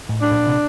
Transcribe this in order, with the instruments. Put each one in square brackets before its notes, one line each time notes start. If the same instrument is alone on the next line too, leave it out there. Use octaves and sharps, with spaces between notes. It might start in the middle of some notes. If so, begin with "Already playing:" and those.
[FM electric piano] A2
[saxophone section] D4
[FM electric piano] A#2
C3